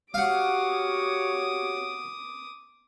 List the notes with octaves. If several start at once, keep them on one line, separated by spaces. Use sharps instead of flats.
F#4 G4 C#5 F5 F#5 D6 D#6